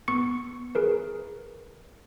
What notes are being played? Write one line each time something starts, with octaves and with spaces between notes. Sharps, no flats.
B3 C#6 C#7
G#4 A#4 B4